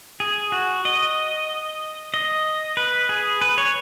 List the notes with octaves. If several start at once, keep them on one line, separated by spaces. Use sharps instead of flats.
G#4
F#4
D#5
D#5
B4
G#4
B4
C#5